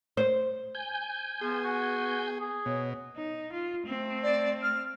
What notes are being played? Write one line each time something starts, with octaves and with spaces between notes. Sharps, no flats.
C5
G#5 G6
F3 B3 G#4
F#4
G#4
B2 C#5
D#4
F4
A3 C4
D5
F6